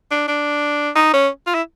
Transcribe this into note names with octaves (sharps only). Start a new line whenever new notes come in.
D4
D4
D#4
C#4
F4
E4